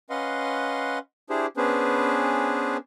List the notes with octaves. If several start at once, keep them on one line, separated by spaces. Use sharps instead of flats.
C#4 B4 D#5 F5 F#5 C6
D4 E4 G4 G#4 C5
B3 C#4 D4 G#4 B4 C5